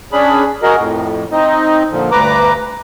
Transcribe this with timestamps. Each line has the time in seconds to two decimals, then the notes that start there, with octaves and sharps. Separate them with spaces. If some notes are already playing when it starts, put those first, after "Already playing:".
0.12 C#4 D4 G#4 B5
0.62 F#4 G#4 A#4 D#5
0.78 F2 A2
1.32 C4 D#4 D#5
1.91 A#2 D3 F3
2.11 D2 G2 B4 A#5 D6